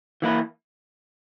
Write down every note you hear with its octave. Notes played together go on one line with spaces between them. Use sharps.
E3 A#3 E4 B4